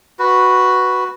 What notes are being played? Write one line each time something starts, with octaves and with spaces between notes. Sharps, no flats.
F#4 B4